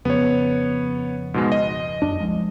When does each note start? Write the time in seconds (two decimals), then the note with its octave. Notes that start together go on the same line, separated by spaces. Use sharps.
0.05 F2 C#3 B3 C#5
1.34 G#2 B2 G#3
1.52 D#5
2.02 F#2 D4
2.20 C2 F3 G#3